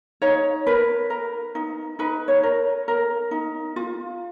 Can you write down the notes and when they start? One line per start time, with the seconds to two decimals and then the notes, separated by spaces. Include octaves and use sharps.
0.22 D#4 C#5
0.66 A#4 B4
1.10 A#4
1.55 D#4
1.99 D#4 B4
2.28 C#5
2.43 A#4
2.88 A#4
3.31 D#4
3.76 F4